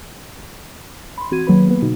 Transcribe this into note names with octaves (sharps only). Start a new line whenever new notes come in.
B5 C6
E3 C4 F#4 G#6 D#7
D#3 F#3 A#3 G#4 B4 B5
A#3 B3 B4
B2 D3 D#4 F#4